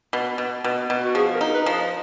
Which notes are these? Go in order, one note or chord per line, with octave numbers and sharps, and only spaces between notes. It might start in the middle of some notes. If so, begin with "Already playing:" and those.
B2
B2
B2
B2
F#4
F3 G#4
A#4
D#4
B4
F3
D#5